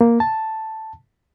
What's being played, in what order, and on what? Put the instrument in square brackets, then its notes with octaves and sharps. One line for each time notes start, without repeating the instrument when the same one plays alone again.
[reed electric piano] A#3
A5